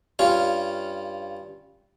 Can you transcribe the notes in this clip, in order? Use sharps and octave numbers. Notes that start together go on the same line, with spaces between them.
G2 C#4 F4 F5 C#6